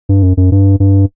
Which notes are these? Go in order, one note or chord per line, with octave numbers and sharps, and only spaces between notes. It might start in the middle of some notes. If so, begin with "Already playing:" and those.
G2
F#2
F#2
G2
G2